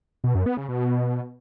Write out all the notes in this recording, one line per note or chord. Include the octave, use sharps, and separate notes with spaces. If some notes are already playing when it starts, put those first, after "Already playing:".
B2
F#2
B3
C#3
B2